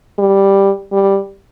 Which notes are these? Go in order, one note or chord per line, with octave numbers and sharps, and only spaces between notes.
G3
G3